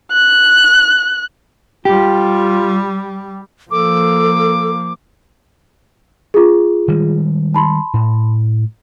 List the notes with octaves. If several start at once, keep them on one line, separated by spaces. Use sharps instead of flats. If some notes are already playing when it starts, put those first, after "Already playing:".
F#6
G3 F4 G4
F3 A#3 A4 D6
F4 G#4
D#3 G3 G#3
A5 B5 C6
A2